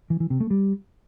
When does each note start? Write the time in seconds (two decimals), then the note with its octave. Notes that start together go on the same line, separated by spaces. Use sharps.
0.10 E3
0.20 E3
0.30 C3
0.40 A3
0.50 G3